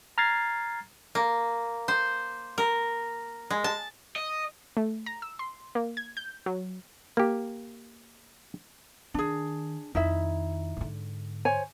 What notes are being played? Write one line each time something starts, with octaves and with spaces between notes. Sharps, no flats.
A#5 F6 G#6 A6 C7
A#3
C5
A#4
G#3
A5
D#5
A3
A#5
E6
C6
A#3
G#6
G6
F#3
A#3 G4
D#3 D4 G#4
F2 D#3 D#4 E4 E5
G#2 D3
C5 C#5 G#5